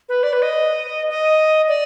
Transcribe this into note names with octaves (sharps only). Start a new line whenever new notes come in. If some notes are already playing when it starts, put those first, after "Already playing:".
B4
D5
B4
D#5
D#5
D5